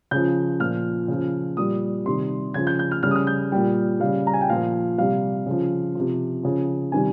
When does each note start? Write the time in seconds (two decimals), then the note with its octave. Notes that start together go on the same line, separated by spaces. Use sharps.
0.11 C#3 F3 G6
0.60 A#2 F3 F6
1.08 C#3 F3
1.57 A#2 G3 D#6
2.06 C3 D#3 G3 C6
2.54 C#3 F3 G#6
2.67 G6
2.79 G6
2.91 F6
3.03 C#3 G3 F6
3.11 D#6
3.15 F6
3.27 G6
3.52 A#2 G3 G5
4.00 C#3 G3 F5
4.27 A#5
4.34 G#5
4.41 G5
4.50 A#2 F3 F5
4.98 C3 G3 F5
5.46 C#3 F3
5.95 C3 F3
6.43 C#3 F3
6.92 C3 D#3 G3 G#5